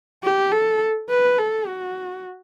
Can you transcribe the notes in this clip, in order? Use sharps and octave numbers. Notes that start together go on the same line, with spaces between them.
G4
A4
B4
A4
F#4